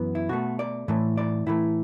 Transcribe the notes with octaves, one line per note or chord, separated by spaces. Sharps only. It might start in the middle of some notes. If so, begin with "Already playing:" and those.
Already playing: F#2 E3 B3
E4
B2 A3 F#4
D5
A2 E3 A3
D5
A2 E3 A3 E4